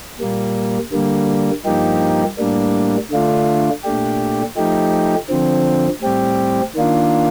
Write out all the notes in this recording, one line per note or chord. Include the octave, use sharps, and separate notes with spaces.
A#2 G3 A#3
D3 G3 A#3
G2 F3 A#3 D#4 G4
A2 G3 A#3 D4
D3 A3 D4 F4
A#2 A3 D4 G4
F3 A3 D#4 G4
D3 F3 C4
A2 G3 C4 G4
D#3 A#3 D4 F4